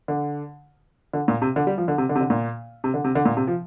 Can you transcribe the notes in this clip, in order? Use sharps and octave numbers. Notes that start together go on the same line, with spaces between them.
D3
D3
A#2
C3
D3
G3
F3
D3
C3
D3
C3
D3
A#2
C3
D3
C3
D3
A#2
C3
F3